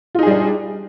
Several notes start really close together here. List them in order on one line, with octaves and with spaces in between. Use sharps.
F4 D#4 G#4 G3 D4